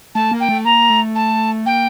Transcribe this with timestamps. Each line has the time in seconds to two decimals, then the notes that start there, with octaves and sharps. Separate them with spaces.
0.15 A3 A5
0.31 A#3
0.40 G5
0.49 A3
0.65 A#3 A#5
0.90 A3
1.15 A5
1.66 A#3 G5